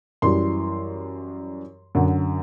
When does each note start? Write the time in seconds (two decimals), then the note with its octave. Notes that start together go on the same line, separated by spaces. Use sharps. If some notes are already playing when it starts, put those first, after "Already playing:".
0.22 F#2 E3 G3 C6
1.95 F#2 D3 F#3